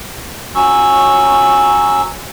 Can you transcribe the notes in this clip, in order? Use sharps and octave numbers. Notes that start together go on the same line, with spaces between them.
F#3 C#4 C#6 E6